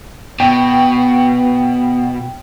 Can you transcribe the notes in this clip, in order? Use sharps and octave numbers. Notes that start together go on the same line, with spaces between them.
B2 B3 G5